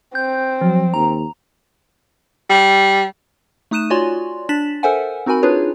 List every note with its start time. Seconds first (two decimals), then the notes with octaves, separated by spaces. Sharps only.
0.15 C4 G6
0.61 F3 F#3
0.94 D#2 A#5
2.50 G3
3.71 A3 D#4 D#6 F#6 D#7 E7
3.90 F4 F#4 C#5 D5 G#5 C6
4.49 D4 A6 B6 E7 F#7
4.83 A4 A#4 C5 E5 F#5 G#5
5.26 C4 D#4 F#4 A#4 G#5 B5
5.43 D4 D#4 F4 G#4 B4 C#5